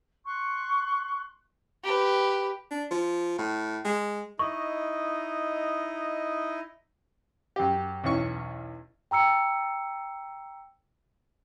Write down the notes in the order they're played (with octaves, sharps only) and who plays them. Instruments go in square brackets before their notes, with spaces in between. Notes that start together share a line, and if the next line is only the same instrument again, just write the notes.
[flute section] C6 C#6 F#6
[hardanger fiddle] G4 B4
[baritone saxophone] D4
F3
A2
G#3
[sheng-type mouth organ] D#4 E4 D#5 [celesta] C#6
[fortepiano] F#2 G4
B1 E2 C#4 C#6
[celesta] G5 A#5 E6 C#7